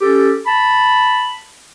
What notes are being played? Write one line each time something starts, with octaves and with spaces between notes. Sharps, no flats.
C#4 G4 A4
A5 B5